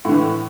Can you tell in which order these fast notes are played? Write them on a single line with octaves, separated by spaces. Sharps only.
A2 D3 E3